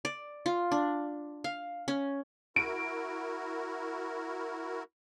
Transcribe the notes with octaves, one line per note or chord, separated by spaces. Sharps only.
D5
F4
D4
F5
C#4
E4 F#4 A#4 D7